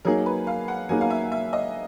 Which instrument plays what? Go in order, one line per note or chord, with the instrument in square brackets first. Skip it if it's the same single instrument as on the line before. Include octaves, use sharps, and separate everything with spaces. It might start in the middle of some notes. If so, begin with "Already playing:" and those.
[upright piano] F#3 A#3 D#4 G#4 [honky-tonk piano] A#4
[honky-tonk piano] B4
F5
F#5
[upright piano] F#3 A#3 D#4 G#4 [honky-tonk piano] G#5
[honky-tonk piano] F5
E5
E5
D#5